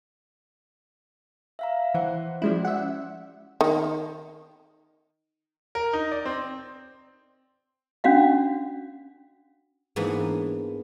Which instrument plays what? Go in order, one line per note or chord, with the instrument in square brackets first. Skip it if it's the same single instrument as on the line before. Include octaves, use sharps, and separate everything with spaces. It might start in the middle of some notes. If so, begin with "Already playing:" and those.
[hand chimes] E5 F5 A#5
[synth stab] E3 [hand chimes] C5 F#5
[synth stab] F3 G#3 E4 [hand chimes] C#4 F#4 D5
[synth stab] E5 F#5
[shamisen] D#3
[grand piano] A#4
D#4
D5
C4
[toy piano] C#4 D4 F#4 F5 F#5
[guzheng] G#2 E3 A#3 B3 D4